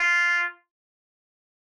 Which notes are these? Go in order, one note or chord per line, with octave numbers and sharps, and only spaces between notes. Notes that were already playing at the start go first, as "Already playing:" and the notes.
Already playing: F4